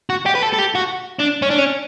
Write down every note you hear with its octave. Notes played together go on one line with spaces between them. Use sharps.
F#4
G4
B4
A4
A4
G4
F#4
D4
C#4
D4
C#4